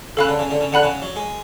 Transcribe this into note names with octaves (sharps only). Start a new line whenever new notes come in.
C#3 A4 F5 B5 F#6
D3
C#3
D3
C#3
D3 F#5 B5 F#6
C#3
F#3
G#3